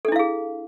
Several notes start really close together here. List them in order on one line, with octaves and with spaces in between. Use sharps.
A4 D4 E4 F5 G#4